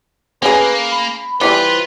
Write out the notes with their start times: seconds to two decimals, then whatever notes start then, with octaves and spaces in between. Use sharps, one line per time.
0.42 A#3 C#4 G#4 B4
0.92 B5
1.41 E3 G3 E4 F4 B4 C5 C6